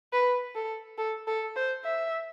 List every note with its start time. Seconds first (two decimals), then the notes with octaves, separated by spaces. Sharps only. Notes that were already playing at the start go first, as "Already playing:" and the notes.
0.13 B4
0.55 A4
0.98 A4
1.27 A4
1.56 C5
1.85 E5